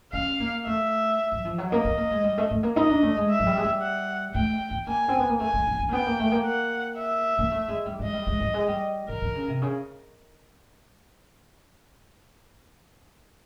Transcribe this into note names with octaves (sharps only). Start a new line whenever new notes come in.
C#4 F5
A#3
A3 E5
F#3
F3
F#3
A#3 D#5
B3
A#3
G#3
G3
A3
A3
A#3
D#4 D#5
D4
A3
G#3
E5
F#3
G3
G#3
G3
F#5
A3 G5
B3
A#3 G#5
C4
B3
A#3
A3 G#5
A#3
B3
C#4
A#3
B3 G5
A#3
A3
A#3
F#5
E5
A#3
A3
G#3
G3
G#3 D#5
G3
G#3
G3
G#3
G3
D3 A#4
D3
C#3
C3
C#3